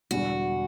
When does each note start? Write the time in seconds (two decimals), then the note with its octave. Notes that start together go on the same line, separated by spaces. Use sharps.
0.11 E1 E2 D3 G3 F#4